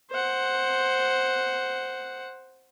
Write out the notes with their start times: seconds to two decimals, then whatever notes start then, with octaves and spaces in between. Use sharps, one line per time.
0.11 C5 F#5